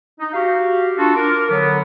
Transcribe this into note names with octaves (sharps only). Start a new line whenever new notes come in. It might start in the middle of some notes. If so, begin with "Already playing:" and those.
D#4
F#4 G4 F5
D4 F4 F#4 A4
A#4 D6
D3 F#3 B3